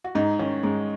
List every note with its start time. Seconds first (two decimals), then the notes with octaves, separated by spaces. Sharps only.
0.04 F#4
0.15 G#2 D#4
0.39 D#3 C#4
0.63 G#2 G#3